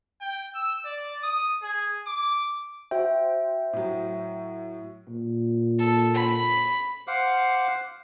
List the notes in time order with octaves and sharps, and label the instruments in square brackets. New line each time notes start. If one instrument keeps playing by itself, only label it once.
[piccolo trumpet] G5
E6
D5
D#6
G#4
D6
[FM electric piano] F#4 C5 G5 [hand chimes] E5
[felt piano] A2 F#3
[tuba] A#2
[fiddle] A4
B5
[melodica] C5 F5 F#5 D6